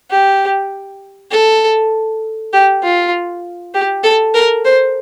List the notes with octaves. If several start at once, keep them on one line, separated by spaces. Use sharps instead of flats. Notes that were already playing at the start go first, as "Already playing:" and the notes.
G4
A4
G4
F4
G4
A4
A#4
C5